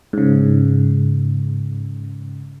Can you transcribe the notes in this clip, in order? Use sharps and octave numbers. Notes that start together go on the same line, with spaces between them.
G#2 C#3